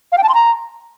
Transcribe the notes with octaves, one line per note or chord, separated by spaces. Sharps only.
F5
G5
A5
C6
A#5